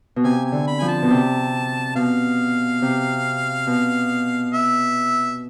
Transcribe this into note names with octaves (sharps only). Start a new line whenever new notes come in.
B2
C3 G#5
G#5
D3
B5
F3 G#5
A5
B2
C3
B2 F5
C3
B2
E5